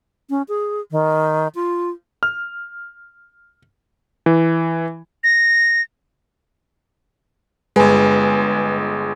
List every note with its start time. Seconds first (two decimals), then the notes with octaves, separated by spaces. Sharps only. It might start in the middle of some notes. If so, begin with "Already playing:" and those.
0.30 C#4
0.48 G#4
0.91 D#3
1.55 F4
2.23 F6
4.26 E3
5.24 A#6
7.76 G1 G2 G#3 B4 G#5